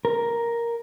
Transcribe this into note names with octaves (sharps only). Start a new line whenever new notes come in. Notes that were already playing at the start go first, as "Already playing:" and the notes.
A#4